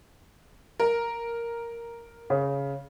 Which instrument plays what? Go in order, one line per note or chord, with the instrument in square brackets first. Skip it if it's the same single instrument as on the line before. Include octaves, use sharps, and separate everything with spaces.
[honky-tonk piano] A#4
[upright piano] C#3